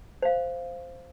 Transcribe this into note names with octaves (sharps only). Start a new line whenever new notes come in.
C5 F5